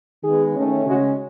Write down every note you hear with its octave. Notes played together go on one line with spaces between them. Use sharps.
D#3 G#3 B3 G#4
D#3 A3 C#4
C#3 G#3 C#4 F#4